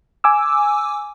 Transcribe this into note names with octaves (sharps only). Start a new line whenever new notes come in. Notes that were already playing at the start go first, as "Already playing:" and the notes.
G#5 D6 E6